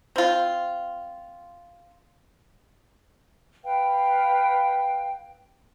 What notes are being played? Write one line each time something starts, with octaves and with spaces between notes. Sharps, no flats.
C4 F4
B4 F5 G5